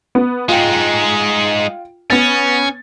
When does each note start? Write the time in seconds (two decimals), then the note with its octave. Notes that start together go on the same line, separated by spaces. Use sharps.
0.15 B3
0.49 G#3 D#4 F4 G5
2.10 B3 C#4 A6